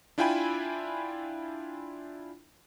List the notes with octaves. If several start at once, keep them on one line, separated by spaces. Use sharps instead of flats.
D4 E4 F4 G5 G#5 B5